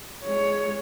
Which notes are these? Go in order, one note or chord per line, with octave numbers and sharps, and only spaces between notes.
G#3 C#5